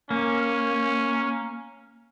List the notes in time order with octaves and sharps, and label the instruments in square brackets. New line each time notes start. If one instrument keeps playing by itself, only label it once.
[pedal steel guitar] A#3 [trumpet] C#4